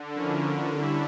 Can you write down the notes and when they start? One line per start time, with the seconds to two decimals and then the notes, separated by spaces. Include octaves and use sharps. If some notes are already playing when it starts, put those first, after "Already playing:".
Already playing: D3
0.15 F3 C#4 E4 A#4
0.77 G3 C#4 E4